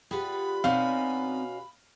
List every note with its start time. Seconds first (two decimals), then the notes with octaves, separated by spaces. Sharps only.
0.11 G3 F4 G#4 B4 F#5 B5
0.64 B2 C4 C#4 D#4 F#4 D5 F5